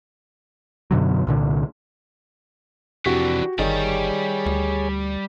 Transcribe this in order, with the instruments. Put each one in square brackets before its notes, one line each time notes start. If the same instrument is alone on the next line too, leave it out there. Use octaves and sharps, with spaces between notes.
[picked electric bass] F#2 B2 D3 F#3
C2 A#2 D3
[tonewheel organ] F2 C3 [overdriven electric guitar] E3 D4 [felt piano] F#4 G4
[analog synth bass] G1 [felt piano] D#3 [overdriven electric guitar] G3 D5 [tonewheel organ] G#4 C#5
[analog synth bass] D2